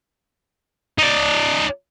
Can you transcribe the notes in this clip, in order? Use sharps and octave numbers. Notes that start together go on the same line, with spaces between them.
D#4 D5